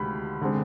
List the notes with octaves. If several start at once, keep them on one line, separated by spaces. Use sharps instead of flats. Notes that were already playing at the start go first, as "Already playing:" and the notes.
Already playing: D2 C3 D#3 G#3 B5
D3 G#3 C4